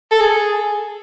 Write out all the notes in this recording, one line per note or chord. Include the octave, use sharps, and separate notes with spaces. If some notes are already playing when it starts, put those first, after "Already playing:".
A4
G#4